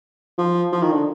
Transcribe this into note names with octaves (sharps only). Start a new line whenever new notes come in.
F3
F3
D#3
D3